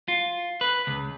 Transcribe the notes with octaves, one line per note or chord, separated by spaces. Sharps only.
F4
B4
C#2